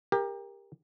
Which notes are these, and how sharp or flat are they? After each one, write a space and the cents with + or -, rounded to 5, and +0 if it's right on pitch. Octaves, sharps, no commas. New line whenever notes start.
G4 +25 A#4 +10